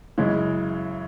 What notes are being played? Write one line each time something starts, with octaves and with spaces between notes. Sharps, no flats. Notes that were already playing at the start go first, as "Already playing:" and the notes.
F#2 C#3 E3 G#3